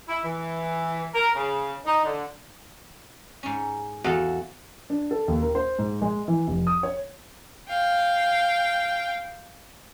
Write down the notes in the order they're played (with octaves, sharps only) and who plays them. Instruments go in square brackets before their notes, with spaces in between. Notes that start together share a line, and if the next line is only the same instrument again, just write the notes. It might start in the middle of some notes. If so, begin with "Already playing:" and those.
[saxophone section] E4
E3
A#4
C#3
D#4
D3
[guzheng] G#2 C#4
[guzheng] E2 F5 [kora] F#4 A4
[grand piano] D4
A4
D#2
A#4
C5
G#2
G#3
E3
F1
D#6
C#5
[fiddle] F5 G5